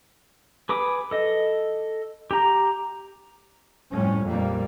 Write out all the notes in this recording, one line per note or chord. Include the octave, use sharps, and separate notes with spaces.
G#4 B4 D6 D#6
A4 D#5
G4 A#5
F2 A2 G3 C#4
A#1 F2 G3 A#3